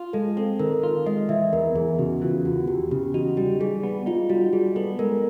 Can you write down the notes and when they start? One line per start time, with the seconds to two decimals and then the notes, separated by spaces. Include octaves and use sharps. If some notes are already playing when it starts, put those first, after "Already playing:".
Already playing: F4
0.13 G#3 A4
0.37 C4 A4
0.59 D#3 A#4
0.83 F4
1.06 G#3 D#5
1.29 E3 E5
1.53 E2 A#4
1.75 E2 G#4
1.99 C#3 F#4
2.22 E3 F4
2.45 E2 F#4
2.68 E2 G4
2.91 C#3 G4
3.14 D#4 F#4
3.37 G3 G4
3.60 G3 G#4
3.83 B3
4.06 D#4 F4
4.29 G3 F#4
4.53 G3 G#4
4.76 B3 A4
4.99 G#3 A#4